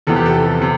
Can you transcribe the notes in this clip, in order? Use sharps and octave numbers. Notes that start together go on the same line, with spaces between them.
E2 C3 F3 B3 A4
G4
A4
C3